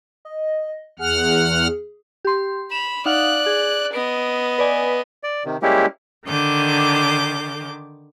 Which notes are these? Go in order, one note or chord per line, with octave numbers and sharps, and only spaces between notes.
D#5
E2 G#4 F#5 F6
G4 C6
B5 E7 F7
D#4 D5 F5 F#5 F#6
G#4
B3 D#5 D7
B4 D5 G#5
D5
C3 D#3
G3 G#3 A#3 C#4 E4 G4
D3 D#3 D6 G6